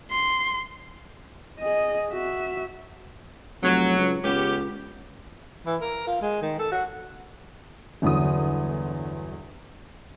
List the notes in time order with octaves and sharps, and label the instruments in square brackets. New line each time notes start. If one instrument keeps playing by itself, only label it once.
[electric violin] C6
[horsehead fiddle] G#4 D#5
F#4 E5
[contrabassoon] F1 [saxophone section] F#3
[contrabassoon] C#2
[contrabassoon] C#2 [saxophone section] B3 C#4 G4
[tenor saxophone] E3
A#4
F4
G#3
D#3
A4
F#4
[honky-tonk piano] G1 E2 D3 F#3 D#6